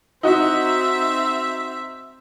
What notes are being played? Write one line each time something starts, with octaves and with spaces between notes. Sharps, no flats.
C4 D#4 F#4 E5